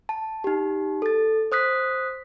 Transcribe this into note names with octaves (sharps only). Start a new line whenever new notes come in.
A5
D#4 G4
A4 A6
C5 D#6 F#6 B6